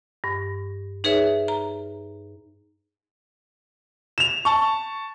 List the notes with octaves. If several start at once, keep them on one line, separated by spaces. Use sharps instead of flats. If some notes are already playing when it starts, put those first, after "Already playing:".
G2
D#4 G#4 B4 C#5 E5
A#5
E7 F7
A5 C#6